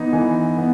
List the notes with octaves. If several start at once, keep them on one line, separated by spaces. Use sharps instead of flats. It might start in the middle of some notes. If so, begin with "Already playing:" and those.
Already playing: E3 B3 D#4
E3 G#5
B3